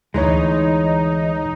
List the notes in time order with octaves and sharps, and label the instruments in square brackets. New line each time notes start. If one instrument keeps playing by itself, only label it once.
[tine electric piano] D2 C#5 [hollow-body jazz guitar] E3 G#3 [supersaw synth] D#4